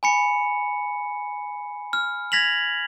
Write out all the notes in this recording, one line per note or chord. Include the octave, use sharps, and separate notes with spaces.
G#5 B5 C#7
F6
G#6 A#6 B6 F7 F#7